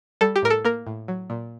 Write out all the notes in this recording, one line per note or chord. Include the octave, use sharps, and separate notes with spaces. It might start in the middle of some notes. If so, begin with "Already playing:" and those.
G3 A4
G4
A2 A#4
A4
A#3 A#4
A2
F#3
A#2